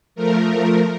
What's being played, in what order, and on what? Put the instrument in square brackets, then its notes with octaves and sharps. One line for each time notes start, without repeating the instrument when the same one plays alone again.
[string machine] F3 A3 A#4